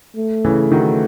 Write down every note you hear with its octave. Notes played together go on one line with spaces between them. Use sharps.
A3
C#3 E3
D#3 F#3